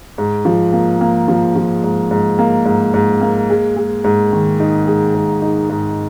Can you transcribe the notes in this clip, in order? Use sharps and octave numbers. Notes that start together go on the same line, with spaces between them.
G#2
F3
A#3
A#3
F3
F3
G#2
G#2
A#3
G#2
G#2
A#3
G#3
G#3
G#2
D#3
D#4
G#3
G#2
D#4
G#2